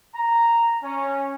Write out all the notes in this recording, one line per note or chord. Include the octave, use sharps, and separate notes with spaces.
A#5
C#4